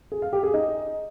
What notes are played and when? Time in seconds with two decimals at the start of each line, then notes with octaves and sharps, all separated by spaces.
0.12 G#4
0.22 F5
0.33 G4
0.43 G#4
0.54 D#4